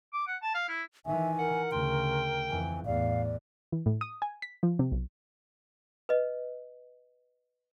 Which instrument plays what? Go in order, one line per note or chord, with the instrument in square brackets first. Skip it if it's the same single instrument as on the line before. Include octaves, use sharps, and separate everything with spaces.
[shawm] D6
F#5
A5
F5
E4
[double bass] D#3 E3 [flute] E5 [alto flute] G#5
[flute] A#4 [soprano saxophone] F#5
[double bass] D2 C#3 [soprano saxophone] G5 [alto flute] C6
[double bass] F2 E3 [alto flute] G#5
[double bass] E2 A2 [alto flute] D5 [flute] F5
[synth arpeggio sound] E3
A2
D#6
G#5
B6
F3
C3
B1
[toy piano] B4 D#5